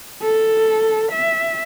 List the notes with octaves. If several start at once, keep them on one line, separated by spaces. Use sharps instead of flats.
A4
E5